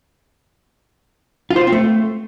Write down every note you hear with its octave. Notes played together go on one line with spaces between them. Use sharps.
F4
C5
F4
C4
A3